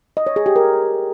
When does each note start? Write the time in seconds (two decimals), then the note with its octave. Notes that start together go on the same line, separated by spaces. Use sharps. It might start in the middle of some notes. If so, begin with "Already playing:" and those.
0.17 D#5
0.27 C#5
0.36 G#4
0.46 G4
0.56 A#4